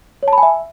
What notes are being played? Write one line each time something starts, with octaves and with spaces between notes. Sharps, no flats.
C#5
A5
B5
G#5
E5